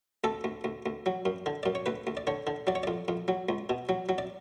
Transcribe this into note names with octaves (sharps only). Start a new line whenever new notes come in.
D2 A4
D2
D2
D2
F#3
F#2
D3
F#2 D5
C#5
D2 B4
D2
D5
D3 C#5
D3
F#3 D5
C#5
F2 D5
F2
F#3
C#2
B2
F#3
F#3
D5